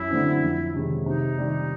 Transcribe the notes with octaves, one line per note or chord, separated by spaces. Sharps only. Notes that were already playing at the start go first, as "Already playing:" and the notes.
Already playing: F#2 E4
D3 F#3 A3 C4
F2
C3 D#3 G#3
C3 D#4
D#3 G3